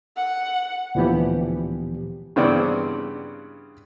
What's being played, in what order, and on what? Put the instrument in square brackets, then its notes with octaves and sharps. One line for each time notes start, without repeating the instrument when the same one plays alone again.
[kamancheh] F#5
[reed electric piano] D2 A#2 E3 F3 B3 G4
[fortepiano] G2 C#3 E3 B3 C4 D5